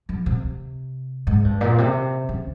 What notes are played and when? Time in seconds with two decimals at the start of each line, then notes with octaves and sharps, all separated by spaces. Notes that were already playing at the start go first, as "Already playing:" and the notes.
0.09 F3
0.26 C3
1.27 G#2
1.45 G2
1.61 A#2
1.78 C3
2.29 C#3